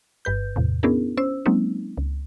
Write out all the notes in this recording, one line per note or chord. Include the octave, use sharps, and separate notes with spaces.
G1 G2 B4 G6
E2 A2 C3
B3 C#4 D4 E4 G#4 A#4
C#4 C5 E6
F#3 G#3 A#3 C4 C#4 D#4
C#2